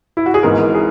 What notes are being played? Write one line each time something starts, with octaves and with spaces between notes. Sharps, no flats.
E4
F#4
G#4
G#1 G#2 E3 A#4
G#4